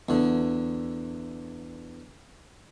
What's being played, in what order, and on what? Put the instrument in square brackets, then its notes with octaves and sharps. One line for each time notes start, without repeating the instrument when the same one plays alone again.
[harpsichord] E2 D3